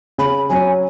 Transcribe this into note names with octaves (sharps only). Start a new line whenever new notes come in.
C#3 B5
F#3 C#4 G#5